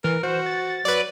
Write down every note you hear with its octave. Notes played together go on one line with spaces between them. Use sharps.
E3 A#4
F#4 C5
A6
F#3 B4 D5